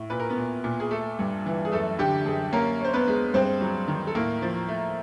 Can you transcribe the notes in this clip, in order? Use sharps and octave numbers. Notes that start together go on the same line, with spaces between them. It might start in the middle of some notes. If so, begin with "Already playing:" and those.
Already playing: A2
A#2 B4
A#4
B3 B4
A#2
A#2
G#4
A3 A4
G2
E3
G#4
F#2 A3 A4
D3 G4
F#2 G#4
A#3 C#4 A#4
C#4 C5
B3 B4
G#3
G2 C4 C5
F#3
D#3
A4
A2 A#3 A#4
F3
A3